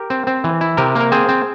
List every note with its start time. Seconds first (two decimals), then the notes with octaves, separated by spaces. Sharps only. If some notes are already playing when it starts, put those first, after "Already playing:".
Already playing: G4 A#4
0.10 C4
0.27 C4
0.44 E3
0.61 E4
0.77 C3 G4 A#4
0.95 A#3
1.00 A#4
1.12 C4 G#4 C5
1.29 C4